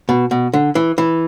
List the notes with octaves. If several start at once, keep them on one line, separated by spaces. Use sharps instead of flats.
B2
B2
D3
E3
E3